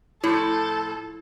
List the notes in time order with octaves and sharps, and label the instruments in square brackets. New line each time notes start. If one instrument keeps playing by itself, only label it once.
[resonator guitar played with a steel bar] A2 F3 [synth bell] E4 [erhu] A4